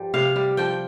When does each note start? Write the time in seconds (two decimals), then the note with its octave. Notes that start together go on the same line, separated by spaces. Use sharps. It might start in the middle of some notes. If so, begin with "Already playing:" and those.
Already playing: G2 F3 G3
0.14 C3 F5
0.36 G3
0.57 F3 G5